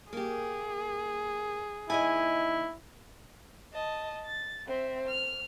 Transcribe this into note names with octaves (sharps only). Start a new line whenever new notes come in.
A#3 G4 G#4
D#2 E4 D#5 G#5
D#5 A5
A6
C4 E5
F6